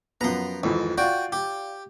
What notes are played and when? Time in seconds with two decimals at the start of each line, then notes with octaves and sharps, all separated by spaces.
0.21 F#2 F3 B3 A#5 C6
0.63 G#1 F2 E3
0.98 F4 F#4 D5 G5
1.32 G4